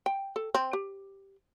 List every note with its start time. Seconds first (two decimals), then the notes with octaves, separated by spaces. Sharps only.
0.06 G5
0.36 A4
0.55 C4
0.73 G4